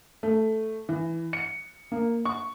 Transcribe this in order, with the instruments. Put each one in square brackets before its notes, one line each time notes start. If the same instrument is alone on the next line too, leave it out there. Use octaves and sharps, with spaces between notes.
[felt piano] A3
E3
C#7
A#3
C#6